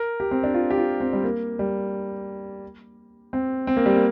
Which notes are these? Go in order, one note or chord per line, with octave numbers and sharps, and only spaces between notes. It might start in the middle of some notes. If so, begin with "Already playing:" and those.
Already playing: A#4
G4
C4
D4
F4
G4
F4
C4
G3
A#3
G3
C4
C4
A#3
G3
A#3